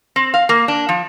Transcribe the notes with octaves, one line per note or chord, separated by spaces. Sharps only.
C4
F5
A#3
D4
F3